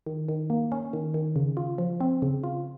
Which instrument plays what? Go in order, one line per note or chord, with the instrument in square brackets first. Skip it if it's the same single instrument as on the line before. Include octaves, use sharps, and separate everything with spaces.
[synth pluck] D#3
D#3
A#3
C#4
D#3
D#3
C#3
F4
F3
C4
C#3
F4